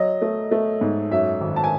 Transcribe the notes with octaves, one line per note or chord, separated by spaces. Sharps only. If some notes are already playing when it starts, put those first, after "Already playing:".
Already playing: F#3 D#5
A3
A3
G#2
F#2 E5
G#1
A5
G#5